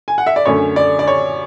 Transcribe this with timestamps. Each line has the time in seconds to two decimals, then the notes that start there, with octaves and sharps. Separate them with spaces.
0.08 G#5
0.18 F#5
0.26 E5
0.36 D5
0.45 F#2 D3 A3 C#4 C#5
0.76 D5
0.99 D5
1.07 C#5